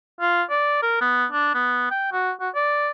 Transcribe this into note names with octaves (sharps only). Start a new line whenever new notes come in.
F4
D5
A#4
B3
D4
B3
G5
F#4
F#4
D5